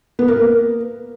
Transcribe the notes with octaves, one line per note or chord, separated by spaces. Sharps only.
B3
A#4
A#3